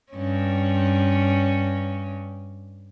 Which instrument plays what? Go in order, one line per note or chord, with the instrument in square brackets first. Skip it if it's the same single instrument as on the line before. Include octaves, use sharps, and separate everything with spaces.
[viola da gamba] G2 C#4